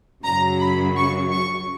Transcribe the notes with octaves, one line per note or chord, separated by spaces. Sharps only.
F#2 C#3 F#3 A#5
B5
C#6
C#6